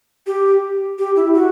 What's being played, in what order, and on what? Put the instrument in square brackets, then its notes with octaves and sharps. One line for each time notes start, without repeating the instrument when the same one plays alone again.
[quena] G4
G4
E4
F#4